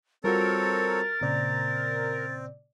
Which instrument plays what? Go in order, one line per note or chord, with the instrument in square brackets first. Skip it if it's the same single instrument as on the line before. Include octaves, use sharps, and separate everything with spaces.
[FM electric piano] G3 F4 F#4 [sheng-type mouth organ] C4 A4 C#5 [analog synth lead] A#4 [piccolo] A6
[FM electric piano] A#2 C#3 D5 [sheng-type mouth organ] C4